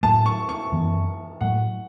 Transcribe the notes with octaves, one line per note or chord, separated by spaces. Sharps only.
A2 F#3 A3 A5
C#6
C#6
F#2 E3 B3
A2 F#3 A3 F#5